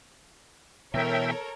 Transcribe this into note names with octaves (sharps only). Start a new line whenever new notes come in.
B2 E3 A4 A#4 C#5 E5 G5